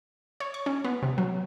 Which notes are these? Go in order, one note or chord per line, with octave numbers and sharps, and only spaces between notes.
C#5
C#6
C#4
B3
C3
F#3